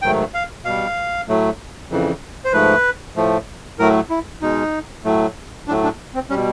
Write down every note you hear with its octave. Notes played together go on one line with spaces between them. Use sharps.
G#2 D#3 F#3 A3 G5
F5
B2 G3 F5
A2 F#3 A3
F2 C#3 E3
C5
G#2 F3 A3 B4
A2 F3 A3
A2 F#3 A3 A#4
E4
B2 G#3 D#4
A2 F#3 A3
A2 F#3 A3 D4
D4
C4
B2 G3 C#4